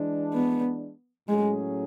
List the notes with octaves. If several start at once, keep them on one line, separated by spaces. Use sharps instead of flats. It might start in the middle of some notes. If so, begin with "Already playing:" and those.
Already playing: E3 G#3 D4
B3
A2 F#3 G#3 C#4 G#4